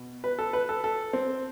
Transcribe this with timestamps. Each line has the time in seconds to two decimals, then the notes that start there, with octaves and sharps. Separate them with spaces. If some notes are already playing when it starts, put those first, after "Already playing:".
Already playing: B2
0.24 B4
0.39 A4
0.53 B4
0.69 A4
0.84 A4
1.13 C4